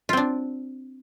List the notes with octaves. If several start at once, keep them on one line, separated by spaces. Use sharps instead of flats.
C4 D4 F4